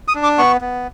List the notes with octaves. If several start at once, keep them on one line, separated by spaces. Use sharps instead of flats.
D#6
D4
D6
B3 C#6
B3